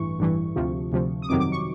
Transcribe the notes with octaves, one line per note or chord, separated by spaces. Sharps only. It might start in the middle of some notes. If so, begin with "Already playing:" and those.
Already playing: A1 G2 E3 C#6
A1 G2 E3
D2 C3 F3
D2 C3 F3
D#6
G1 F2 C3 D#3 F#3 D6
D6
C#6